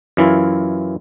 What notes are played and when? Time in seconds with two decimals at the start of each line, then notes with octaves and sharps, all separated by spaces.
0.17 F#2 E3 E4 F4